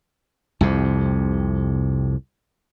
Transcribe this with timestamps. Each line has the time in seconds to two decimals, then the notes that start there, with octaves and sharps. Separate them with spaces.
0.61 C2 F2 C3